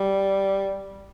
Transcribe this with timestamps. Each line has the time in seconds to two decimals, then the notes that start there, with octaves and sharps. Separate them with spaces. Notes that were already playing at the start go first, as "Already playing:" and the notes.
Already playing: G3